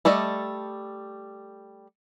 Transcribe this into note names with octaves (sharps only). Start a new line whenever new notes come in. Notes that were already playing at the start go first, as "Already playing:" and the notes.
G3 A3 A4 D5 D#5